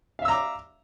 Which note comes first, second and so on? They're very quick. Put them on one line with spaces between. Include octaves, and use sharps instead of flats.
F5 E5 E6 A#5 D6